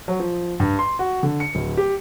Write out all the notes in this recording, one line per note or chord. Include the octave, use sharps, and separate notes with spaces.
F#3
F3
G2
C6
F#4
D3
C#7
D1
G4